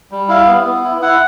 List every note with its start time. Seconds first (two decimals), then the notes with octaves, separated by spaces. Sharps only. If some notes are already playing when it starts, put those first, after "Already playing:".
0.11 G3
0.29 E4 F5
0.47 B3
0.65 B3
0.84 E4
1.02 E4 F#5